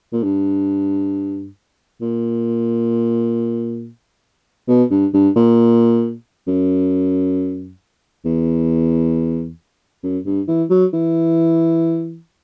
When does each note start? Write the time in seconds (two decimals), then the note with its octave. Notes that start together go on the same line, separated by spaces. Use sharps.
0.13 A#2
0.23 G2
2.02 A#2
4.68 B2
4.91 G2
5.14 G2
5.36 A#2
6.47 F#2
8.25 E2
10.03 F#2
10.26 G2
10.48 E3
10.70 F#3
10.93 E3